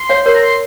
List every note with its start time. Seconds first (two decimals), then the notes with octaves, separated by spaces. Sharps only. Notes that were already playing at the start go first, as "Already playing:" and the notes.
Already playing: C6
0.09 C#5 F5
0.26 A#4 C#5
0.35 A#5
0.43 C6